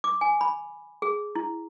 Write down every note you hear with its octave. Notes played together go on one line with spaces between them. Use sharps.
D6
G#5
B5
G#4
E4